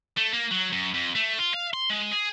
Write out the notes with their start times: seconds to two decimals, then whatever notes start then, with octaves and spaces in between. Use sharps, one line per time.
0.17 A3
0.33 A#3
0.51 F#3
0.73 F#2
0.94 F2
1.15 A3
1.38 F4
1.54 F5
1.73 C6
1.90 G#3
2.12 G#4